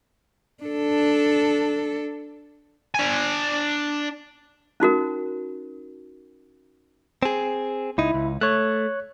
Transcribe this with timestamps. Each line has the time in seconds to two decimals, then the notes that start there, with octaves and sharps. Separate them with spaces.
0.63 D4 A4
2.94 D4 G#5
4.80 C#4 D#4 F#4 A#4
7.23 C4 G#4
7.98 C#2 D#4 E4
8.14 C#2
8.41 A3 C#5 F#6